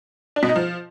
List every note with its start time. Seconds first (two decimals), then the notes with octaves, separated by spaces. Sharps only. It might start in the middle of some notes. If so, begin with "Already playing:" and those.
0.36 D4
0.43 B2
0.49 D#4
0.56 F3